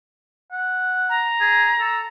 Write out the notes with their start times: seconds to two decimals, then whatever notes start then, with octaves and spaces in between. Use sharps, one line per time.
0.52 F#5
1.09 A#5
1.41 G#4
1.80 A4